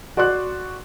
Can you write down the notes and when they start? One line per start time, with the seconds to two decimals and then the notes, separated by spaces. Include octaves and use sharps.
0.17 F#4 D5 C6 C#6 F#6